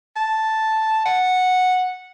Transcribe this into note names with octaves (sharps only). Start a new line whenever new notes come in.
A5
F#5